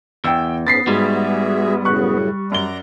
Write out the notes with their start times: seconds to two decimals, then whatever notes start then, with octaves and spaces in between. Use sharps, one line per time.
0.24 E2 G5 E6
0.67 G#2 B3 C#4 A6 B6 C7
0.87 G#2 G3 F#4 G#4 E5
1.85 F#2 A2 C#3 C#6 F#6
2.52 F#2 D5 A#5 G7